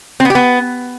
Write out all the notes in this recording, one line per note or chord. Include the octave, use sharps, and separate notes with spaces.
C4
B3
G4
B3